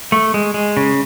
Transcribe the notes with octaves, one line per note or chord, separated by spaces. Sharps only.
A3
G#3
G#3
C#3